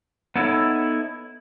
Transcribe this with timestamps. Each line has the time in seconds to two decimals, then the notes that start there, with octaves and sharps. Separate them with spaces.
0.36 B3 D#4 E4 A4 C#5